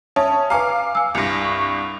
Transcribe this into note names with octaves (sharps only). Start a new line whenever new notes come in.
C#4 E5 A5 D#6
B4 F5 G#5 A#5 D6
G#5 E6
C2 G2 A#6 C#7
C#6